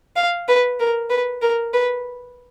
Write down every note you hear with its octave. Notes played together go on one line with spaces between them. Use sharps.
F5
B4
A#4
B4
A#4
B4